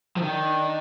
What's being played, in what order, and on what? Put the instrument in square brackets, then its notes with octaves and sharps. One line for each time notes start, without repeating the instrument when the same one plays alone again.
[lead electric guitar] F3
[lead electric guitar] D#3 [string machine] D4